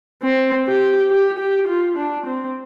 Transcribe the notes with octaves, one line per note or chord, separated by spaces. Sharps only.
C4
G4
G4
G4
F4
D4
C4